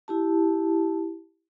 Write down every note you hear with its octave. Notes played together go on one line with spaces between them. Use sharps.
E4 G4 A5